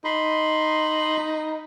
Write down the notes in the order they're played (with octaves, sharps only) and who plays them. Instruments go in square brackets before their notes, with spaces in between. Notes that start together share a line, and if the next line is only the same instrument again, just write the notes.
[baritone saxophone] D#4 [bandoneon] B5 C6